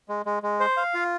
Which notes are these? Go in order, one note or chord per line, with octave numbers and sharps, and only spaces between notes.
G#3
G#3
G#3
C5
F5
F4